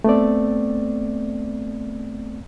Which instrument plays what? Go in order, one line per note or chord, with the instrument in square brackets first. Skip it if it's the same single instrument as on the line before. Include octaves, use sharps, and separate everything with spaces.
[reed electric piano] A3 B3 C4 D5